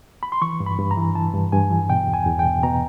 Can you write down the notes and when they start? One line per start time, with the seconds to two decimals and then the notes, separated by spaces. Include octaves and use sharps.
0.23 B5
0.32 C6
0.42 E3 C#6
0.60 G2
0.66 B5
0.79 G2
0.91 A#5
0.97 E3
1.15 E3 A5
1.34 G2
1.52 G2 G#5
1.71 E3
1.89 B2 G5
2.08 E2
2.14 G#5
2.27 E2
2.39 G5
2.45 B2
2.63 B2 A#5